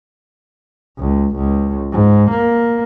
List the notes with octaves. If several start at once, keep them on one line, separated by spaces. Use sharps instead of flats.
C#2
C#2
G#2
A#3